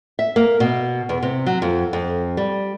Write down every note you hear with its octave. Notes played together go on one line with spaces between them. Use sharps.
E5
A#3
B2
E2
C3
F#3
F2
F2
G3